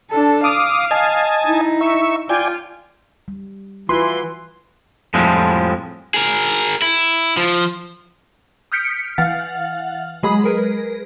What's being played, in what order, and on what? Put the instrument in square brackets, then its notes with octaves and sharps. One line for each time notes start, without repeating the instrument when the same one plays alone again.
[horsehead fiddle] D4 A4
[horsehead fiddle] F5 [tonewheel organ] D6 D#6
[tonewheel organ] D#5 G#5 A5
[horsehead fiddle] D#4 E4
[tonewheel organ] E5 C#6
[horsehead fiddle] F4 [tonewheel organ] D5 G5 G#5
[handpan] G3
[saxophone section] E3 [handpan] F4 F#4 [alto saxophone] B4 [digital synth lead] C6
[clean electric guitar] F2 A2 F3 G3 G#3
[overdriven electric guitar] G#4 A#4
E4
F3
[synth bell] D#6 F6 G6 B6 C#7 D7
E3 F5 F#5 F6 A6
F#3 G#3 G#4 B5 D#6
G#4 A#4 B4